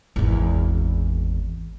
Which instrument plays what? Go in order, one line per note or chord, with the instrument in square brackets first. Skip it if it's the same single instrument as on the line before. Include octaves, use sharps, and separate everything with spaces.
[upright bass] G#1 E2